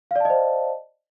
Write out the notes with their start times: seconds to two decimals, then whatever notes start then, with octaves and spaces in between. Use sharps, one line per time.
0.11 F5
0.16 D5
0.20 A5
0.25 D#5
0.30 C5